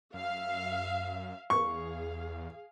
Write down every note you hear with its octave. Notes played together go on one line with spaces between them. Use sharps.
F#2 E5 F5
E2 G#4 F5 C#6